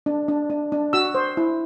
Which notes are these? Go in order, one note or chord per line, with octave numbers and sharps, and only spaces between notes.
D4
D4
D4
D4
F#4 E6
C5
E4